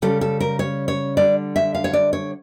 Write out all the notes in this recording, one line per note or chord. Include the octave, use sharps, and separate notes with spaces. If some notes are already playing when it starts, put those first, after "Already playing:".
C#3 G3 A4
A4
A#4
C#5
C#5
D3 G3 D5
E5
F5
C#5
D5
C#5